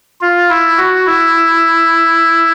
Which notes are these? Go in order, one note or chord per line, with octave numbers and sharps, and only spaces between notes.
F4
E4
F#4
E4